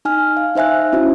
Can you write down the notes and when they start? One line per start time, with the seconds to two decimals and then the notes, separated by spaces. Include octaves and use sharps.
0.05 D#4 G#5 F6
0.37 F5
0.55 D#4 C5 E5 G#5 F#6
0.93 C#4 E4 F#4 C5